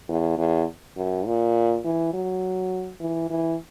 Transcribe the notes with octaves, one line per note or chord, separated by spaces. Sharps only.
E2
E2
F#2
A#2
E3
F#3
E3
E3